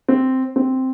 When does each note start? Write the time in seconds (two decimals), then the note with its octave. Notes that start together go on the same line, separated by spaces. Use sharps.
0.08 C4
0.56 C4